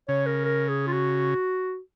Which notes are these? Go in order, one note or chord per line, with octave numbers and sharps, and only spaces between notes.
C#3 C#5
A#4
A#4
G#4
F4
F#4